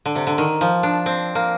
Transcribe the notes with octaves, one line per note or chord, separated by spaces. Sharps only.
D3
C3
D3
D#3
F3
D4
C4
A#3